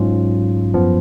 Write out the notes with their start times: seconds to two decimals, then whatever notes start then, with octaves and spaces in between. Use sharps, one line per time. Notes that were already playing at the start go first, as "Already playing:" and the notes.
Already playing: G#2 F#3 C#4 F4
0.74 F#2 F3 B3